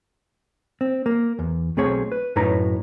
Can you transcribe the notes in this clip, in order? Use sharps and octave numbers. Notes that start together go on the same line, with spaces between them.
C4
A#3
E2
B1 A3 C4 G#4 C#5
B4
F#2 A2 D#4 B4 C#5 A#5